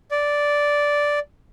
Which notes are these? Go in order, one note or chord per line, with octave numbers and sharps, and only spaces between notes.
D5